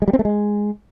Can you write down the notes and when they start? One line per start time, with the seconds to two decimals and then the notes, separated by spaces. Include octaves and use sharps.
0.02 G#3
0.08 G3
0.13 C4
0.19 A3
0.25 G#3